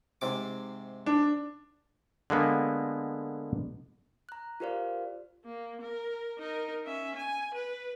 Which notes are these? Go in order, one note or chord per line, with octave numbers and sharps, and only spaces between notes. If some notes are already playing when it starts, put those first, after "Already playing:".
G#2 C3 D6
D4
D3 G#3 A#3 B3
A#5 F#6
F4 G4 A#4 C5 D5 F5
A#3
A#4
D#4 A#4
C#4 E5
G#5
B4